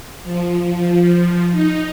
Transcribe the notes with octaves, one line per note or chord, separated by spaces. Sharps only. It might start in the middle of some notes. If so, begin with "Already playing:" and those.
F3
D#4